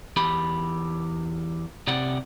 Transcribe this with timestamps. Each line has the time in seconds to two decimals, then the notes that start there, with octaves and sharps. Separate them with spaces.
0.16 E2 G4 B5
1.87 C3 G4 D5 F#5